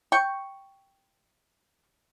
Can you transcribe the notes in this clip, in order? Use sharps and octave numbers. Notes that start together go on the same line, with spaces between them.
G5 C#6